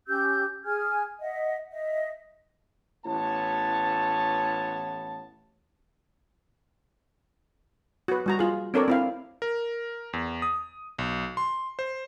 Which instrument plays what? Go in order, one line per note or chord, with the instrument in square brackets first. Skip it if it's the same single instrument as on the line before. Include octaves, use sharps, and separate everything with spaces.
[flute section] C#4 G4 E6 G6
G#4 G#5 F6 G#6
D#5 E5 F#5
D#5 E5
[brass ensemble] A1 E3 A3 B3 C#5 A5
[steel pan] F#4 B4
G3 F#4 A#5
F4 G#4
C4 D4 A4 A#4 C#5 D5
C4 E4 F5
[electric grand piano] A#4
E2
D#6
B1
C6
C5